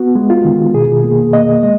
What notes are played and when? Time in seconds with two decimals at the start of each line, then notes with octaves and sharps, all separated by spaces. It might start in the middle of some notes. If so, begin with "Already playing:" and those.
Already playing: B3 F#4
0.15 G#3
0.30 F4
0.45 D#3
0.74 B2 G#4
1.04 A#3
1.33 A#3 D#5
1.63 G#3 D#5